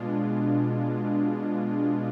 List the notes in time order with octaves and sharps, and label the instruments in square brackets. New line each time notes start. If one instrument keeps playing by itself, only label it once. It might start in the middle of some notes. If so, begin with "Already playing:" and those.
Already playing: [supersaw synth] B2 G#3 D4 F4